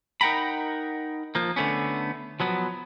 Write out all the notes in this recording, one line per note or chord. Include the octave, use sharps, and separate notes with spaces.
D#4 A#4 F#5 G5 A#5 B5
F3 A#3
D3 A3 B3 C#4
F3 F#3 B3